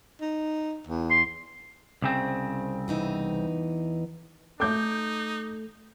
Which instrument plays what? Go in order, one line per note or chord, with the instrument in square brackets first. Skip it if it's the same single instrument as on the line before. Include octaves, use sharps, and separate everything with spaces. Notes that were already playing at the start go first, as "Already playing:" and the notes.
[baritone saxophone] D#4
E2
[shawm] C6
[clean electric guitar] C2 C#3 C4
[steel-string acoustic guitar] E2 E3 D#4
[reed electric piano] A3 A4 [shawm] D#4 [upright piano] D6 G6